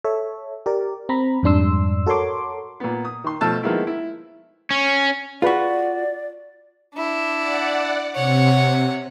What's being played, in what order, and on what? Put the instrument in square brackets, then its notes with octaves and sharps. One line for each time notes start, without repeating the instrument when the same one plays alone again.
[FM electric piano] A4 C#5 E5
G4 A#4 D5
C4 A#5 B5
F2 G#2 G3 D4 C6 E6
F#4 A4 A#4 C#5 C6 D6
[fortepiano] A#2 B3
D#6
D#3 C6
B2 F3 A3 A5 E6
D#3 F3 G#3 A#3 B3 E4
E4
[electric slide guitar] C#4
[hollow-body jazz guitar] F4 F#4 [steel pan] G#4 B4 B5 [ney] D5
[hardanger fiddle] D4 E4
[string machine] D5 F#5
[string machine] C3 [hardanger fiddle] C#5 F#5